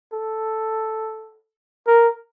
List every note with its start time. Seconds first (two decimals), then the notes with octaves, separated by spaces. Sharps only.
0.13 A4
1.87 A#4